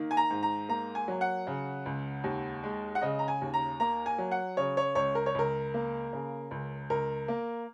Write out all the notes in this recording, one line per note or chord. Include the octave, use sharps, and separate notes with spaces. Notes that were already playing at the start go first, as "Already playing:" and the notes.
Already playing: D#3 A#3
G#5
A#5
G#2
A#5
A#3 A#5
G#5
F#3
F#5
C#3
C#2
D#2
G#3
F#5
C#3 D#5
A#5
G#5
D#2
A#5
A#3 A#5
G#5
F#3
F#5
C#3 C#5
C#5
C#2 C#5
A#4
C#5
C#2 A#4
A#3
C#3
C#2
C#2 A#4
A#3